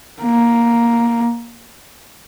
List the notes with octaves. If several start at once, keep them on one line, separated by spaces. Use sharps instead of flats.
A#3